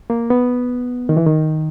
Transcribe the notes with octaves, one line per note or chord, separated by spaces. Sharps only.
A#3
B3
D#3
E3
D#3